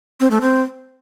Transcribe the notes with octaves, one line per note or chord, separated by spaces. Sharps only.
C4
A3
C4